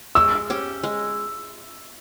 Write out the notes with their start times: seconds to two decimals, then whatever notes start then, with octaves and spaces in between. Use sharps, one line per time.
0.15 G#3 E6
0.50 C#4 G4
0.83 G#3